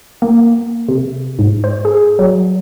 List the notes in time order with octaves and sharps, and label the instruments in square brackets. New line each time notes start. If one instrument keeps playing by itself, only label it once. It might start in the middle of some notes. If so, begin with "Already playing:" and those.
[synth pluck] A#3
C3
G#2
C5
G#4
F#3